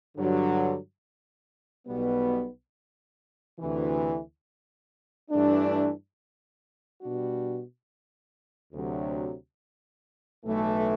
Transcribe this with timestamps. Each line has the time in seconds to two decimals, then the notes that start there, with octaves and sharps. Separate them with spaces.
0.16 G2 D3 F#3
1.87 B1 B2 G3 B3
3.59 D2 C3 E3
5.30 G2 E3 A3 D4
7.01 B2 G3 D4 F#4
8.73 D2 C3 F#3
10.44 B1 A2 E3 A3